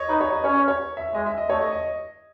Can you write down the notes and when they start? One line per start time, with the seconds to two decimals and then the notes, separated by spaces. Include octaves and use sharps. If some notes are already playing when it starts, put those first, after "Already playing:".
Already playing: C#5 D#5
0.09 D#4 B4
0.21 C#5
0.33 D#5
0.44 C#4 C#5
0.68 C#5
0.97 E5
1.14 G#3 D#5
1.26 E5
1.38 D#5
1.49 A3 C#5
1.61 D#5
1.72 D#5